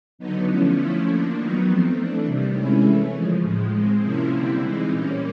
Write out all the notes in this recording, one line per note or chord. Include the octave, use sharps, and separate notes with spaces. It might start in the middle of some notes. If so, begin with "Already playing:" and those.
D3 F#3 B3 D#4
D3 F3 A3 C#4 E4
F3 A3 C#4 E4
F3 A#3 D4
D#3 F#3 B3 D#4
F3 A3 C4
E3 A3 D4
C3 D#3 G3
C3 D#3 G#3 C#4 E4
E3 A3 C#4
C#3 F3 G#3
A2 F3 G#3
D#3 G#3 C4
C3 F3 A#3 C#4 E4
D3 G3 C4 E4
E3 G#3 C4 D#4
A#2 G3 A#3 C#4